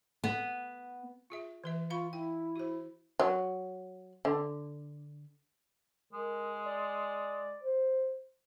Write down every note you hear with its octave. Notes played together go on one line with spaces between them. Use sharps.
B3
F4 G#4 E5
E3 B4 E5
F4 F5 B5 C#6
E4 G5
F#4 C5
F#3
D3
G#3 A#4
D5
C5